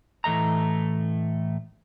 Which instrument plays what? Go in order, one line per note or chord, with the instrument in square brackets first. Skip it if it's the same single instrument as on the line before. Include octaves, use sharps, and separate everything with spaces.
[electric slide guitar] A2 E3 A3 D#5 A#5